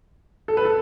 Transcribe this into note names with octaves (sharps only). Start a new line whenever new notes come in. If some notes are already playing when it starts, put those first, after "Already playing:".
A4
B4
A4